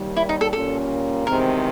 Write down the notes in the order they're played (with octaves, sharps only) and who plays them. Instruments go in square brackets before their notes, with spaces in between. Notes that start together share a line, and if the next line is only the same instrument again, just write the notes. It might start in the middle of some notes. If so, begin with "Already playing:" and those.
Already playing: [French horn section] D#2 D#3 G3
[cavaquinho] E4
D#4
A4
[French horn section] A#2 G3 A#3 C#4 [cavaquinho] A4
[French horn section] E2 C3 D#3 G#3 C4 [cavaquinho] A#4